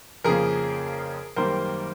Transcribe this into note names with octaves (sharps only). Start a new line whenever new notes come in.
F2 C#3 F3 A#3 G#4 A#4
F#2 D#3 G3 A#3 A#4 C5